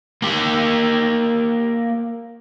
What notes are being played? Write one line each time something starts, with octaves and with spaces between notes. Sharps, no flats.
A#3 G4